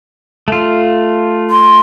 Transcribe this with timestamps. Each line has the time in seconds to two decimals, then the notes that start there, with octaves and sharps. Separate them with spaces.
0.48 A3 F4
1.50 C6